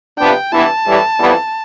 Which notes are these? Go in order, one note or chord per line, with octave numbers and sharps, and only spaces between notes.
C3 F3 B3 D4 G5
G2 E3 B3 E4 A5
A2 E3 G3
F2 E3 G3 B3